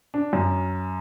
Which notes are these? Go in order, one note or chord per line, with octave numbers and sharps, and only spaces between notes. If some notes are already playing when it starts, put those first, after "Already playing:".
D4
F#2